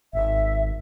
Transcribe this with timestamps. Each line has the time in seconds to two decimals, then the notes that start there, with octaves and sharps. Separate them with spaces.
0.13 G#1 E5